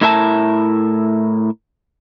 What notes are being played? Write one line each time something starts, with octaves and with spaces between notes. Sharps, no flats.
A2 E4 A#4 E5 G5 A5